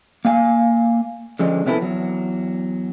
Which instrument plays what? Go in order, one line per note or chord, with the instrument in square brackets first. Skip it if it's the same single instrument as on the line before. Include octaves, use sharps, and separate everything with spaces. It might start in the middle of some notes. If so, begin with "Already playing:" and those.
[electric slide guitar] A#3 F5 G#5
D3 F3 G#3 C#4
C3 B3 C#4 E4 A4 B4
E2 F#3